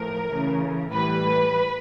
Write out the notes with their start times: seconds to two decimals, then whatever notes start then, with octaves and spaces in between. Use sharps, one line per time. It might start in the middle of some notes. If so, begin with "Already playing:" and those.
Already playing: A2 F3 A3 A#4
0.30 C#3 E3 A3
0.92 A2 E3 G3 B4